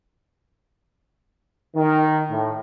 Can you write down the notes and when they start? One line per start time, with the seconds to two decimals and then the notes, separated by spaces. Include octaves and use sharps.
1.76 D#3
2.30 A2